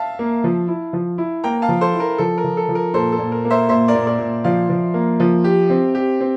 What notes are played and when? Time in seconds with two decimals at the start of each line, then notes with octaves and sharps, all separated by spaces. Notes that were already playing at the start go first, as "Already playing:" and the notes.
Already playing: E5 F5 A5
0.19 A#3
0.44 F3
0.68 E4
0.93 F3
1.18 E4
1.44 A#3 G5 A#5
1.62 F5 A5
1.69 F3
1.81 A4 C5
1.94 E4
2.00 A#4
2.18 F3 A4
2.38 A#4
2.44 F3
2.57 A4
2.69 F3
2.75 A#4
2.94 A#2 A4 C5
3.12 A4
3.19 A#2
3.32 A#4
3.45 A#3
3.50 C5 E5
3.69 A#2 C5 E5
3.88 A#4 D5
3.95 A#2
4.07 A#4 D5
4.19 A#2
4.44 F3 D5 F5
4.69 F3
4.94 A#3
5.20 F3
5.44 G4
5.70 C4
5.95 G4
6.20 C4